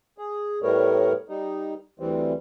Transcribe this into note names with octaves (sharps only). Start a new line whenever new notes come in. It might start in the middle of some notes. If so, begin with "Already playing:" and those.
G#4
A2 G3 A3 B3 A#4 C#5
G3 D#4
D2 E3 G3 C4